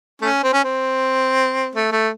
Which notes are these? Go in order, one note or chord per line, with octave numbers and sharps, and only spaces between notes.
A3 C#4
C4
C#4
C4
A3
A3